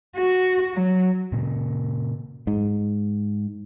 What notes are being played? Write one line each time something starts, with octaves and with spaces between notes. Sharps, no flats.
F#4
F#3
A#2 C#3
G#2